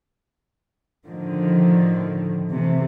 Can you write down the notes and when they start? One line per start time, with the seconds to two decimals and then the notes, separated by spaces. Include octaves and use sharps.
1.07 A2 D3 D#3 F3
2.50 C3 E3 A3